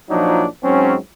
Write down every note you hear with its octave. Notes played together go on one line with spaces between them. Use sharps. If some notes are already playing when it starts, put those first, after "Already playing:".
A#2 F3 F#3 D4 D#4
G#2 F#3 C4 C#4